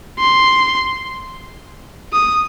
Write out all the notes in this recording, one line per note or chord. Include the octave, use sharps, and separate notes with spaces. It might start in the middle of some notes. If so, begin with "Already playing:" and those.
C6
D#6